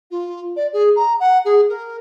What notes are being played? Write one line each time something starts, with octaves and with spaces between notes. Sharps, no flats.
F4
D5
G#4
A#5
F#5
G#4
A#4